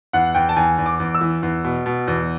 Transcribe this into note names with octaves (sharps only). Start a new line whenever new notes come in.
E2 F#5
E2 G5
A5
E2 G#5
E2
D6
E2
E6
E3
E2
B2
B2
E2